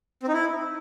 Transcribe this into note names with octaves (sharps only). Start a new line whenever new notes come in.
C4
D#4
E4